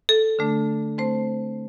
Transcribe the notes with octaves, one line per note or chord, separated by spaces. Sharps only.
A4
D3 A3 D4
A3 C4 C5